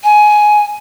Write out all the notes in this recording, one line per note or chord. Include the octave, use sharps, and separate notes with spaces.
G#5